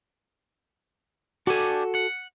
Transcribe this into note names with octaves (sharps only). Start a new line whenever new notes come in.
D4 F#4 G4 A4 G#5
F#5